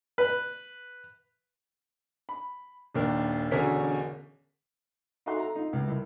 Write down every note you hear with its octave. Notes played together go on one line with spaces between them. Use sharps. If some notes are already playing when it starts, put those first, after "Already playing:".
B4
B5
D#1 D#2 D4 A#4
E1 B2 D3 C#4 A#4 B6
D#4 F#4 A4 E5 F#5 C6
A4 A#5
D#4 F4
C#2
C2 E4